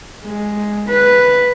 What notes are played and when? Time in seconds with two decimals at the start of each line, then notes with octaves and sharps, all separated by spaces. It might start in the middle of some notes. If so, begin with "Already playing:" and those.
0.24 G#3
0.88 B4